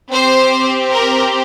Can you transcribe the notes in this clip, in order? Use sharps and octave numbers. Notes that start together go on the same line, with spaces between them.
C4 G4 C5
A#4